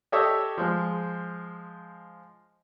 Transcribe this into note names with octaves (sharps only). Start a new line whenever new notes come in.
G4 A4 C#5 D#5 E5
F3 G#3